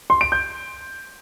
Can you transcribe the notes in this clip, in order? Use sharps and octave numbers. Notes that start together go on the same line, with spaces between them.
C6
D7
G6